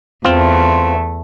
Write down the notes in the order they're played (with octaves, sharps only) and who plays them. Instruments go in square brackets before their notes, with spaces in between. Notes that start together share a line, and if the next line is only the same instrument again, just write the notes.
[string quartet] E2 A3 [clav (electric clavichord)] C4 F4